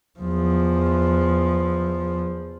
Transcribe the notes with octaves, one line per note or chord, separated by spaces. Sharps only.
E2 F3